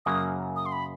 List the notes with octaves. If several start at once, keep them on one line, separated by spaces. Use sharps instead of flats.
F#2 C#3 F#3 A#3 D#6
D#6
C6
B5